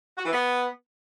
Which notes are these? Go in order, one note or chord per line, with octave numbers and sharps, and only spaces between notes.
F#4
E3
B3